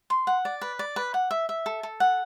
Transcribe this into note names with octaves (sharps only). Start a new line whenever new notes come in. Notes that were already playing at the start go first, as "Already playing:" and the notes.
C6
F#5
D5
B4
D5
B4
F#5
E5
E5
A4
A4
F#5